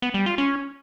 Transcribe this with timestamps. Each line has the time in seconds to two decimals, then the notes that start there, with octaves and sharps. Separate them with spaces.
0.02 B3
0.14 G3
0.26 F4
0.38 C#4